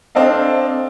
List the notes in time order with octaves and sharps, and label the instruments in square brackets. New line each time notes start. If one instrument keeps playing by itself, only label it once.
[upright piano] C4 D4 A4 D#5 F5